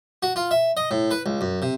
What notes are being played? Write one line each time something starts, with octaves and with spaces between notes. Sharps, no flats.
F#4
F4
E5
D#5
A2
B4
C#2
F#2
C3